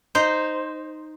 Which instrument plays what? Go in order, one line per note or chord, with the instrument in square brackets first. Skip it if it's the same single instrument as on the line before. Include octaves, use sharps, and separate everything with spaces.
[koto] D#4 C5